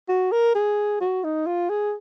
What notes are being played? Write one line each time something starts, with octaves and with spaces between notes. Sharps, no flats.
F#4
A#4
G#4
F#4
D#4
F4
G#4